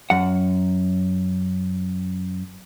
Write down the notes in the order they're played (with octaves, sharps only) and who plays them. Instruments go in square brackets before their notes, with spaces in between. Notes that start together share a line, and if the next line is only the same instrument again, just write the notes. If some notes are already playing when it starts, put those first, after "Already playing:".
[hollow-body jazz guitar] F#2 F#5